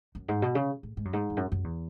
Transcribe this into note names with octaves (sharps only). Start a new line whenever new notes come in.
F#2
G#2
B2
C#3
A2
G#2
F#2
G#2
E2
F#2
F#2
E2